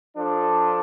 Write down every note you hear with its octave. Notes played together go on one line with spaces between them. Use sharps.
F3 D4 A4